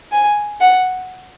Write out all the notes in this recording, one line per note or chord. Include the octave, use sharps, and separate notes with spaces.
G#5
F#5